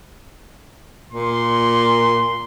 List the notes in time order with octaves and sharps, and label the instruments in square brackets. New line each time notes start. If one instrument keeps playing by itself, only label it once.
[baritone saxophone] A#2 [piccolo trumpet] C6